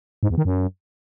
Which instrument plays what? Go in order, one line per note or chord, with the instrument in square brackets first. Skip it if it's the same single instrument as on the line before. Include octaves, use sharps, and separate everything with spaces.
[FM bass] G#2
E2
D#3
F#2